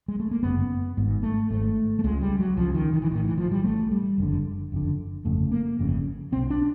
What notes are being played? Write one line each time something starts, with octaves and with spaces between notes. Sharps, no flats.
G#3
A3
A#3
G1 F#2 C#3 B3
G#1 G#2
A3
G#1 G#2 A3
A3
C#2 C#3 G#3
G3
F#3
C#2 C#3 F3
D#3
D#3
E3
A1 A2 D#3
E3
F3
G3
A1 A2 A3
G3
F#1 F2 D3
F#1 F2 D3
G1 F2 C#3 A3
A#3
G1 F2 C#3
C2 B2 C4
D4